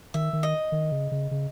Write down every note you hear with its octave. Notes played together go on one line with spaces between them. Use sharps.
D#3 E5
D#3
D#5
D#3
C#3
C#3
C#3